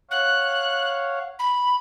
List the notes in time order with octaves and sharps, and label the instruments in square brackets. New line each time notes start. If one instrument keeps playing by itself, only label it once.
[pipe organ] C#5 F5 F#5 [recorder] F#6
[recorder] B5